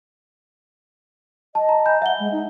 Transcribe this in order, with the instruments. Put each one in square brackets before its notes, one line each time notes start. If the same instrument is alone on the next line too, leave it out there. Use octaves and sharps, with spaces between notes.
[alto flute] D#5 [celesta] A5
[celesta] A#5
G#5 B5 G6
[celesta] E5 G7 [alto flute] F#5
[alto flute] G#3
D#4